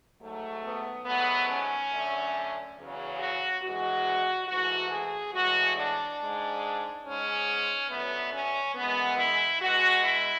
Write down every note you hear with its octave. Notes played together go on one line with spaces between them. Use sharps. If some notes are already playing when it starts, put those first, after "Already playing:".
G#2 F#3 A3
B3
G#2 F#3 A3 B3
C#4
F#2 D3 A3
E2 C#3 F#3
F#4
F#2 E3 G#3 F#4
G#2 E3 A3 F#4
G#4
A2 E3 G#3 F#4
D4
G#2 G#3
G#2 G#3 C#4
F#2 D3 F#3 A3 B3
C#4
F#2 E3 G#3 B3
E4
B2 G#3 F#4
E4